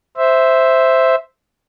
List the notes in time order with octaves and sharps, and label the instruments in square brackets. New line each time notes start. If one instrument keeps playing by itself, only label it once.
[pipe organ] C5 E5